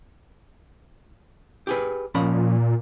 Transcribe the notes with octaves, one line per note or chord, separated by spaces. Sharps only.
G4 G#4 B4
A#2 F3 C#4 B5